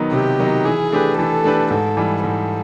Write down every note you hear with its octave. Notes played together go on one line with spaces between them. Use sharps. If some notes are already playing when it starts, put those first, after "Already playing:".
Already playing: D#3 F#3 B3 D#4
C3 G4
D#3 F#3 B3 D#4
E3 G#4
A3 D4 G4 B4
E3 A4
A3 D4 G4 B4
G#2 A4
E3 G3
G#2 A4